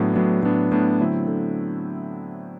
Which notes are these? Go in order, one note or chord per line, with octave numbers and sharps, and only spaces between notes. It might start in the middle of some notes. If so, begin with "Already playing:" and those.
Already playing: A2 F#3 B3 D4
A2 F#3 B3 D4
A2 F#3 B3 D4
A2 F#3 B3 D4
D3 F#3 A3 C4 E4
D3